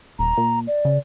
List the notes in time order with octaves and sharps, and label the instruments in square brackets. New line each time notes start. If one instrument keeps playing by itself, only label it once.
[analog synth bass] D#1 [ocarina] A#5
[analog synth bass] A#2
[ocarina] D5
[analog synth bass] C#3